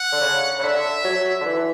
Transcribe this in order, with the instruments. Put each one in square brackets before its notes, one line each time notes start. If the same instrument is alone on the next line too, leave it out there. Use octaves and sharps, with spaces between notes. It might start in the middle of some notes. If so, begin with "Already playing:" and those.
Already playing: [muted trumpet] F#5
[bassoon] D3
C#3
C#3
[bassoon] D3 [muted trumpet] E5
[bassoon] F#3
D3
E3